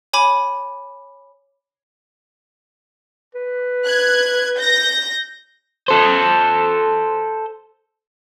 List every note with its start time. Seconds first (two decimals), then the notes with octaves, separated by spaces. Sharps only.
0.13 C#5 G#5 B5 D6
3.35 B4
3.85 F#6 G#6
4.57 G6 A#6
5.88 A4 C5